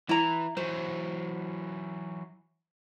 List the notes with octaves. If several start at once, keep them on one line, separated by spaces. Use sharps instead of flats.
E3 E4 A#5
E3 F#3 C5